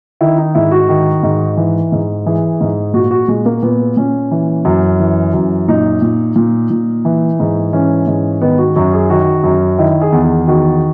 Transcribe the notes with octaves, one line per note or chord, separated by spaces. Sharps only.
D#3 E4
D#4
G#2 E4
F#4
D#3
G#2
E3
G#2
E3 G#4
G#2
A#2 F#4
F#4
A#2 G#3
A#3
A#2 B3
A#2 C#4
E3
F#2
E3
F#2
A#2 D#4
A#2
A#2
A#2
E3
G#2
E3 C#4
G#2
D#3 B3
F#4
F#2 F#4
G#4
D#3 F#4
F#2
D#3 E4
G#4
E2
G#4
D#3 F#4